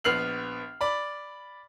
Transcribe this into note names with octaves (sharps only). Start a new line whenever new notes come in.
A#1 B3 F6 C7 F#7
D5 B5